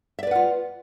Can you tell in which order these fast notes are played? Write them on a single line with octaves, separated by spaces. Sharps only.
E5 D5 B4 F#5 F4